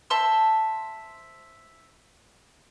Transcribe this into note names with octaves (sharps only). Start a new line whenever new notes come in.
C5 E5 A5 C6